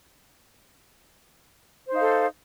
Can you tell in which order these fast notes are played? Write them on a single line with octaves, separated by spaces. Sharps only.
C5 D#4 F5 A4